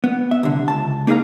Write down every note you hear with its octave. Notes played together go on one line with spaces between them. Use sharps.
B3
E5
C2 D3
C#2 A5
A#3 D#4 G#4 B4 F5 A#5